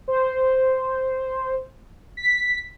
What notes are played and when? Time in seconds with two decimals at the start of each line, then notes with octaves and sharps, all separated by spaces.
0.08 C5
2.17 B6